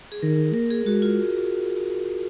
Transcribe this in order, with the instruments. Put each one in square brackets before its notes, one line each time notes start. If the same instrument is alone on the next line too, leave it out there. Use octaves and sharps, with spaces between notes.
[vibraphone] G#4
[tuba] D#3 [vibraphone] A#4
[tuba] A#3 [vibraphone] A#4
[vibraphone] G#4
[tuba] G#3 [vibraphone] F#4
[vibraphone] F4